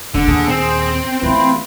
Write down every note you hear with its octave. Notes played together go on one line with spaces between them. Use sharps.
F1 D3
D#2 A#2 G#4
C4
E3 A3 E4 F4 B4